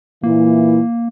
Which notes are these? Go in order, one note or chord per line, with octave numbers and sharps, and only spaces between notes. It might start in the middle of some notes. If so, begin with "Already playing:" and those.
A#2 E3 A#3 E4